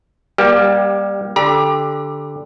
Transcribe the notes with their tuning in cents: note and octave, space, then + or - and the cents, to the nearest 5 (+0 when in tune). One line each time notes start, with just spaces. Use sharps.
G3 +15 A#3 +35 G4 +0
D3 +0 G4 +15 A#5 +45